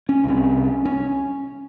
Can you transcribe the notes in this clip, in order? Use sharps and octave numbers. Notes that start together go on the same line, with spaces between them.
C#4
C2 C3
C#4